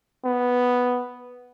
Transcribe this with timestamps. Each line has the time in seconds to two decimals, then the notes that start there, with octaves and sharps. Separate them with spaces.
0.25 B3